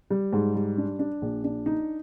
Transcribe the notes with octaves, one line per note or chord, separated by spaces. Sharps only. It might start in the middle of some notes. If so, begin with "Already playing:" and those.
G3
G#2
G3
D4
D4
A#1
D4
D#4